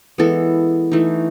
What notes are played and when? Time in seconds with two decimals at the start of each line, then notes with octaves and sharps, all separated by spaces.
0.18 E3 G#3 B3 A4
0.92 E3 A3 D#4